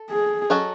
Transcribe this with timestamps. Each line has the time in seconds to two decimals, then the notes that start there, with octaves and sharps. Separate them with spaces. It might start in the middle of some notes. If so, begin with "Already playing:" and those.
Already playing: A4
0.11 G#4
0.50 F#3 C#4 F#4 A4 D#5